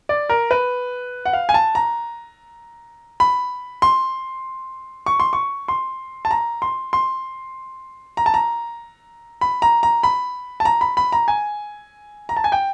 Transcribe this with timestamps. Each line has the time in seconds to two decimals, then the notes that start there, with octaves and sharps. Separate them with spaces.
0.09 D5
0.29 A#4
0.51 B4
1.25 F#5
1.33 F5
1.49 G#5
1.54 A5
1.75 A#5
3.20 B5
3.82 C6
5.06 C#6
5.20 C6
5.33 C#6
5.68 C6
6.25 A5
6.31 A#5
6.62 C6
6.93 C6
8.17 A#5
8.26 A5
8.34 A#5
9.41 B5
9.62 A#5
9.83 A#5
10.03 B5
10.60 A5
10.65 A#5
10.81 B5
10.97 B5
11.12 A#5
11.28 G#5
12.29 A#5
12.37 A5
12.44 G#5
12.52 G5